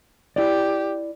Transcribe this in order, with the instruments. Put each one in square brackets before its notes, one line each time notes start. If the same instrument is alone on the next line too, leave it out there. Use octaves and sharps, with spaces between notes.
[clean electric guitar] E4 D5 [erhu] G4